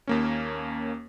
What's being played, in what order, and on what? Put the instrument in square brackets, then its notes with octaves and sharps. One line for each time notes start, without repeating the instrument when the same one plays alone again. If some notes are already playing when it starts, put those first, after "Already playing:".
[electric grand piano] D#2 A#3 C#4